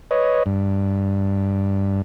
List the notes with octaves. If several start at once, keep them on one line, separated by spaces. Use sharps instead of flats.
B4 C#5 D#5
G2